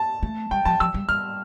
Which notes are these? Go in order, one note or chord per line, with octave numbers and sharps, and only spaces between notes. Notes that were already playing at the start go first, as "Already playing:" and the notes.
Already playing: A5
A3
G3 G5
F3 A5
F3 E6
G3
G3 F6